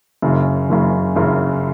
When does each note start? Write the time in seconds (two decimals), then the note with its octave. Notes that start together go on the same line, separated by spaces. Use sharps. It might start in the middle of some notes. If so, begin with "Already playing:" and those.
0.22 F#1 F#2 C#3
0.69 F#1 F#2 C#3
1.15 F#1 F#2 C#3